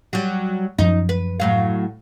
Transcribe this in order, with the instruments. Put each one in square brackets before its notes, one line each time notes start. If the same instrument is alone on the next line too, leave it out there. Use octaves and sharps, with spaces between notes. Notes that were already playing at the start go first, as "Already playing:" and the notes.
[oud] F#3 G3
[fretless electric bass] F#2 F3 [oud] D#4
[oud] B4
A2 F#3 F5